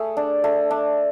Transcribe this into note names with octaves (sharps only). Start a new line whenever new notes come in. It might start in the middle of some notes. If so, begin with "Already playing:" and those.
Already playing: A3 G#4
D4
A3
D4